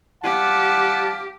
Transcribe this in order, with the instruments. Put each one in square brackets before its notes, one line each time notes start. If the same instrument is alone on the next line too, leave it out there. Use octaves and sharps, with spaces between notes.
[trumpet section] G3 F5 A5 [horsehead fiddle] G4 [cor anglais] F#5